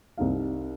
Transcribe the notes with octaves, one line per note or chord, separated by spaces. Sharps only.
C2 C3 G3 C4 D#4 F5